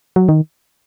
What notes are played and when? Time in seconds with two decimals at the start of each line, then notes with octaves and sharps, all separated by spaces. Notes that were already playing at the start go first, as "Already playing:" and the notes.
0.16 F#3
0.29 D#3